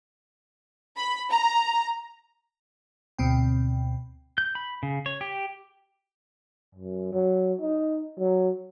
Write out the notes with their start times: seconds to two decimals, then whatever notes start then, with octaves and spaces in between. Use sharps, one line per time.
0.97 B5
1.31 A#5
3.19 D2 B2 C4 G5
4.38 G6
4.55 B5
4.83 C#3
5.06 C#5
5.21 G4
6.75 F#2
7.12 F#3
7.61 D#4
8.19 F#3